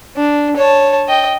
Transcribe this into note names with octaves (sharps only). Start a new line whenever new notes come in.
D4
C#5 A5
D#5 G5